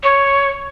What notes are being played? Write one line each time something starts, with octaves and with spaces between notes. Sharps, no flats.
C#5